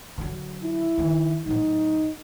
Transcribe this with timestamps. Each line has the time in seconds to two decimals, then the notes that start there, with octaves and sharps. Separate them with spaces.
0.18 D3 F#3
0.64 E4
0.98 D#3 D#4
1.46 A2 F#3 D#4